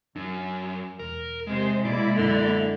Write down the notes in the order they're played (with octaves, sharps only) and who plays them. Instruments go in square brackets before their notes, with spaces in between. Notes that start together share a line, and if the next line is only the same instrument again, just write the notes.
[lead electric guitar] F#2 [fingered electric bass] D4
[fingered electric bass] E1 [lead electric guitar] A#4
[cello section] C3 C5 [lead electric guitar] G#3
[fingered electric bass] B2 [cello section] G#3 A#3 E4 [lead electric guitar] D5
[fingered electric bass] D#1 F#2 B3 [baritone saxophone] D3